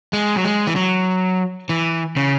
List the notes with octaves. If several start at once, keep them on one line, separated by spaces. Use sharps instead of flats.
G#3
F#3
G#3
E3
F#3
E3
C#3